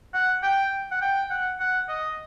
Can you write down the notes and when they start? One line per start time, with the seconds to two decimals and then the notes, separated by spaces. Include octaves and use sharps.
0.14 F#5
0.43 G5
0.91 F#5
1.01 G5
1.30 F#5
1.60 F#5
1.89 D#5